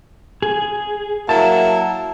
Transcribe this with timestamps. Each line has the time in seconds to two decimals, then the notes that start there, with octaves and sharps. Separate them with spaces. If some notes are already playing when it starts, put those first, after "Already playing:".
0.42 G#4
1.29 F#3 A#3 E4 A5